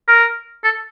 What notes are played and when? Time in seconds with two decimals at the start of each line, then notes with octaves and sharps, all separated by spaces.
0.08 A#4
0.64 A4